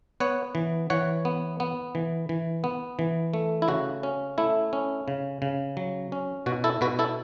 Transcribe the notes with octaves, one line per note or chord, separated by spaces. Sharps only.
B3 C#5 F#5
E3
E3 C#5 F#5
B3
B3
E3
E3
B3
E3
A3
E4
C#3 F#4
C#4
A3 E4
C#4
C#3
C#3
F#3
C#4
B2 F#4
E4 A4
B2 F#4 B4
E4 A4